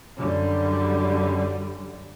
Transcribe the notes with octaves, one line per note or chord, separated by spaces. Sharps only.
F#2 D3 G3